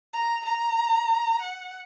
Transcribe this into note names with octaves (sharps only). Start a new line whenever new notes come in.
A#5
A#5
F#5